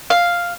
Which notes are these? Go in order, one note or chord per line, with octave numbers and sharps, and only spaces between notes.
F5